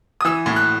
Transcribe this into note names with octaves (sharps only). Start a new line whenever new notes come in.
D#6
E3 E6
A2
F#6